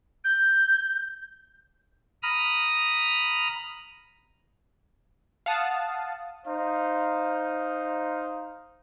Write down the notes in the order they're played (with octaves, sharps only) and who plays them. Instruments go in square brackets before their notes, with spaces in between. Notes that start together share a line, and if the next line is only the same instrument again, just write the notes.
[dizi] G6
[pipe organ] A#5 B5 D#6 F6
[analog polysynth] F5 F#5 A5 D#6
[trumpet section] D#4 C5 F5